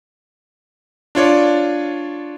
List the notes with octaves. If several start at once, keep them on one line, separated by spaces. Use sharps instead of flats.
D4 F4 C#5 D5